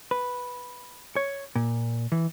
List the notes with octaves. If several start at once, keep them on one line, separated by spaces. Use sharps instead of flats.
B4
C#5
A#2
E3